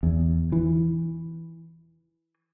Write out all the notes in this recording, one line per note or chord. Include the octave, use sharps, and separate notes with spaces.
E2
E3